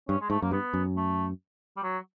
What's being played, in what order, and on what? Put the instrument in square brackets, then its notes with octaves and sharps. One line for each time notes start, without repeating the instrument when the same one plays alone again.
[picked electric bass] G2 [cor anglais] C#4
[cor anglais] G#3
[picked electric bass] G#2 [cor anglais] A3
[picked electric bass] F#2 [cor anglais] A#3
[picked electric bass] G2 [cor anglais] B3
[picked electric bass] F#2
[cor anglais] A3
G3
F#3